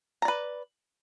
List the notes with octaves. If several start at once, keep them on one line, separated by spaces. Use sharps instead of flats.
B4 D5 A#5